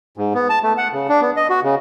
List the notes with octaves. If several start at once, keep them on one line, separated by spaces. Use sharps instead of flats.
G#2
B3
A5
A3
F#5
C#3
D4
B3
D#5
F#4
C#3